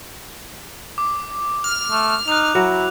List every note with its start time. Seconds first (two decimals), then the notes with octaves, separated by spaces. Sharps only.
0.98 D6
1.64 F6
1.91 A3
2.28 D#4 F#6 F7
2.55 F#3 E4 F#4 A#4